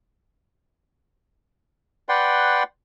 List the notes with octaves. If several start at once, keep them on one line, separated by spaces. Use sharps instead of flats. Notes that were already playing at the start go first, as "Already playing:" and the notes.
B4 D5 F#5 G5 C6